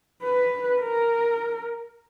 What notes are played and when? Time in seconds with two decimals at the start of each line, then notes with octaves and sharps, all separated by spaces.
0.23 B4
0.80 A#4